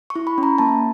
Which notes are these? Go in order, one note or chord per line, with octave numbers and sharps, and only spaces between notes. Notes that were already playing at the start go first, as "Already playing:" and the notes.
C#6
E4
B5
C#4
A#5
A#3 A5